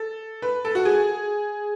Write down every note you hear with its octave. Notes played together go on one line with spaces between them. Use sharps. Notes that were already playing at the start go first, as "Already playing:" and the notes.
Already playing: A4
B4
A4
F#4
G#4